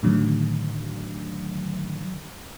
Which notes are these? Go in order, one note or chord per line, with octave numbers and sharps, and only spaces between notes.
A2 D3 D#3 F#3